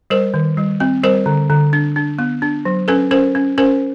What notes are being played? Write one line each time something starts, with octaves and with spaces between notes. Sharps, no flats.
G3 A#4 C5
D#3
G3
C4
G3 A#4 C5
D3
D3
D4
D4
B3
D4
F#3
C#4 A4 B4
C#4 A#4 C5
C#4
C#4 A#4 C5